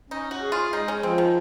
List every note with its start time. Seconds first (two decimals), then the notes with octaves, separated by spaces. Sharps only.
0.10 C#4 D#4
0.31 F#4
0.42 G#4
0.52 F4
0.73 G#3 D#4
0.88 C#4
1.03 F3 C4
1.18 D#3